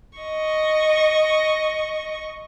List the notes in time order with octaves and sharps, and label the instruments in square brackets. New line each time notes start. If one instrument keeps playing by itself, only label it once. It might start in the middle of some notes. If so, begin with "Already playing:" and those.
[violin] D#5 C#6